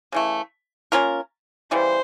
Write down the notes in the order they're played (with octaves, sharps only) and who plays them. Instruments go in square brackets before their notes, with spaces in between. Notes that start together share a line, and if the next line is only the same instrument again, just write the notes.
[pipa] C#3 E3 A3
A#3 C#4 F4 A#4
[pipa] C#3 E3 G3 [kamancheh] C5